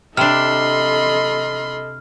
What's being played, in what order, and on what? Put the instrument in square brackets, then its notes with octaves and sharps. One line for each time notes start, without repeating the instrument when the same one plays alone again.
[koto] C3 D4 [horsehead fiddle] A4 D#5 [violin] B5 C6 [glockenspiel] F6